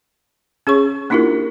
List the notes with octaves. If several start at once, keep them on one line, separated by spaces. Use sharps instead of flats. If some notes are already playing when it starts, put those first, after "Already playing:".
C#4 G#4 C#5 C#6
A#3 D4 E4 F4 G4 A#4